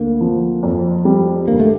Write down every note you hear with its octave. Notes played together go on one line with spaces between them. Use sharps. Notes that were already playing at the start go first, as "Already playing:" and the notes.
Already playing: D2 A#3
F3
F2
G3
G1 A#3
A3